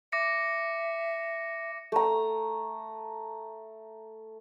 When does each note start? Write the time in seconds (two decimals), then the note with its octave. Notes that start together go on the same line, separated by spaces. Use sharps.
0.12 E5 D6 A#6 C#7
1.92 A3 A#5